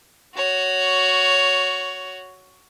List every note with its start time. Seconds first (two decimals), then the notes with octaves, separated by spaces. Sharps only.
0.35 F#4 C#5